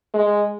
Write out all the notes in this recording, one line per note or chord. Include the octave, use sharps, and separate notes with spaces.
G#3